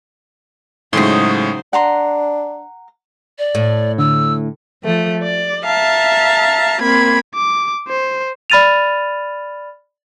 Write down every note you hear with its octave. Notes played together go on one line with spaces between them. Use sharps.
A2 C#3 F#3 G#3 D#4 C5 C6
D4 F#5 A#5 C6
D5
A2
D3 E6
F3 A3
D5
E5 F5 A5 A#5
A#3 C4 B5 G#6
D6
C5
D5 B5 F6 A6 D#7 F7